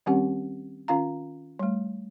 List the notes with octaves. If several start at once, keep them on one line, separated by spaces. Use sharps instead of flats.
D#3 G3 C4 C#4 G4 F#5
D#3 C#4 F4 F5 A#5
G3 A3